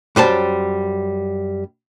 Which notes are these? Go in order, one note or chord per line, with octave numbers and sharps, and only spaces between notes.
F#2 G3 C5 A5